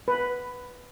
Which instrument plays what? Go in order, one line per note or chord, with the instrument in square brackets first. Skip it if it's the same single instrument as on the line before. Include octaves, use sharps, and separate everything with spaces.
[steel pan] B4